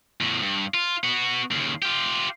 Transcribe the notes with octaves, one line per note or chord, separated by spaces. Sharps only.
E2 A2
G2
F4
B3 F#4
D#2 C#3
F4 G4